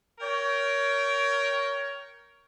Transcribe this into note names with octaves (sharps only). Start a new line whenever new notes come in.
A#4 C#5 G5